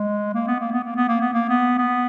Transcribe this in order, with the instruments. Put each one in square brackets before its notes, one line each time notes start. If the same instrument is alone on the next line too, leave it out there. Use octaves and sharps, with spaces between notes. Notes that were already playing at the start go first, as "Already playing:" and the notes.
Already playing: [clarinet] G#3
A#3
B3
A#3
B3
A#3
B3
A#3
B3
A#3
B3
B3